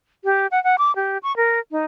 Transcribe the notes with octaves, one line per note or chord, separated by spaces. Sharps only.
G4
F#5
F#5
D6
G4
C#6
A#4
D#4